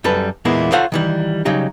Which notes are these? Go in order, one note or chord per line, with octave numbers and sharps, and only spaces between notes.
F#2 G3 A4 B4
E2 A#2 G#3 A#3 B3 E4
F4 A4 C5 C#5 F5 F#5
D#3 E3 G3
C#3 F#3 G3 D#4 G4